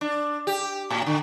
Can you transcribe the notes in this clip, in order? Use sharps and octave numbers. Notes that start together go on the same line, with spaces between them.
D4
G4
A2
D3